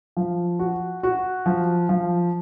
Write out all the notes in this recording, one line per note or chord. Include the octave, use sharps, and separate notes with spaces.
F3
F#4
F#4
F3
F3